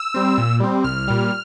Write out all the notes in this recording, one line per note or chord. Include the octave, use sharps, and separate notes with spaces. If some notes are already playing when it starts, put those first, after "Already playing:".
Already playing: E6
G3 C4
A#2
G3 C4
C2 F6
A#2 G3